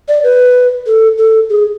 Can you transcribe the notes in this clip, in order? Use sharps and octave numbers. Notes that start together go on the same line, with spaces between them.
D5
B4
A4
A4
G#4